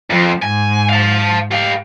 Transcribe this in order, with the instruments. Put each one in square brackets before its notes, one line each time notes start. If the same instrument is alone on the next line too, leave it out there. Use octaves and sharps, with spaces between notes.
[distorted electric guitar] F2 [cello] F3
[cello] G#2 [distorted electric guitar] G#5
[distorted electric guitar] F5 A5
G4 F5